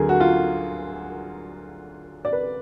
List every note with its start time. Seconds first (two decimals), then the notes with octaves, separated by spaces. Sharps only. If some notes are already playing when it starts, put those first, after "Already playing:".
Already playing: D2 D3 F#3 G#4 A#4
0.09 F#4
0.20 F4
2.25 D5
2.33 B4